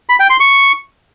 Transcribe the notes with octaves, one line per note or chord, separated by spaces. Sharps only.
B5
G5
C6
C#6